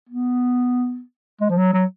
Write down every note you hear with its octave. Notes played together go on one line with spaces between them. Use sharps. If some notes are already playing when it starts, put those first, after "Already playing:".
B3
G#3
F3
F#3
F#3